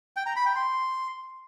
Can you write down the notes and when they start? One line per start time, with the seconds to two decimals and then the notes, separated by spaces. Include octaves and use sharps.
0.16 G5
0.26 A#5
0.36 B5
0.46 G5
0.56 C6